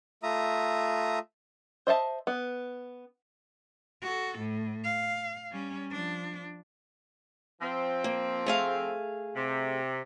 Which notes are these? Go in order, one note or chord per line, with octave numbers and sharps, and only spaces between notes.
A3 F4 E5 A#5 D#6
C5 D#5 E5 A5
B3
F#4 A4
A2
F5
G3 C#4
F3 D4
F3 C4
A#3
A3 G#4 F5
C3